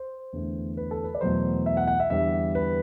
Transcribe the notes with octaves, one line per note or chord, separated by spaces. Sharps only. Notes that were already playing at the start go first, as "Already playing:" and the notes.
Already playing: C5
E2 D3 A3
B4
A4
B4
D5
E2 B2 F#3 A3 C5
E5
F#5
F#5
E5
E2 D3 G3 E5
B4